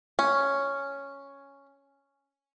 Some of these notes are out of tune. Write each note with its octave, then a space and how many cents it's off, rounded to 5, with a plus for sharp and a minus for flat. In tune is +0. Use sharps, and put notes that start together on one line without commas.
C#4 +0